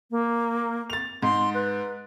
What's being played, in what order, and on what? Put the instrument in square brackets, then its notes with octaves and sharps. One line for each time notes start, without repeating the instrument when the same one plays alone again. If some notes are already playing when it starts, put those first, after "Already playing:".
[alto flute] A#3
[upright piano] A6 F7
[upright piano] G#2 [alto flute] C6
[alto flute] B4